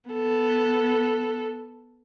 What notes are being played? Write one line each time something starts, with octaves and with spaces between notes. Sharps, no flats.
B3 A4